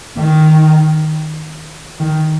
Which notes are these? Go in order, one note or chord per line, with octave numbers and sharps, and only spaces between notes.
D#3
D#3